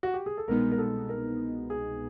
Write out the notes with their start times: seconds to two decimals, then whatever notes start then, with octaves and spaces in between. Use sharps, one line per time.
0.03 F#4
0.14 G4
0.26 G#4
0.37 A4
0.48 C2 B2 G#3 B3 D#4 A#4
0.72 A#4
0.78 A4
1.09 A#4
1.70 G#4